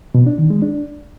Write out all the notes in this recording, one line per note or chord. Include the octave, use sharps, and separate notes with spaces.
B2
D4
D#3
G#3
D4